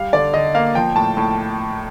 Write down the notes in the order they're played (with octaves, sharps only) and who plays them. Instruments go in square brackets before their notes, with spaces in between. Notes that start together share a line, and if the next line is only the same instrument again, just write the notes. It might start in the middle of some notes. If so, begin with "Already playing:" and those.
Already playing: [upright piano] G3 F5
D3 D5
D3 D#5
A#3 F5
F3 G5
A2 A5
A2